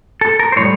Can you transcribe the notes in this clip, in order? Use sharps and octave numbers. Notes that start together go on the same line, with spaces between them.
A4
A#4
C5
A2 E3 G3 C#5